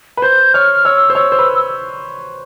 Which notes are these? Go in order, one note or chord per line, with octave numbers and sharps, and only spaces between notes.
B4
C5 G6
C#5 F6
C#5 E6
C5
C#5 E6
C5
B4